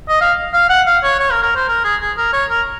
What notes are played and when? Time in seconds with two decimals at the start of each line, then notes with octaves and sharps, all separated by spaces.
0.08 D#5
0.21 F5
0.53 F5
0.69 F#5
0.86 F5
1.03 C#5
1.19 C#5
1.31 A#4
1.43 A#4
1.55 C5
1.68 A#4
1.84 G#4
2.01 G#4
2.17 A#4
2.33 C#5
2.50 A#4